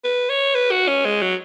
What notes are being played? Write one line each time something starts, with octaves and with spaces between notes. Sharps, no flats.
B4
C#5
B4
F#4
C#4
G#3
F#3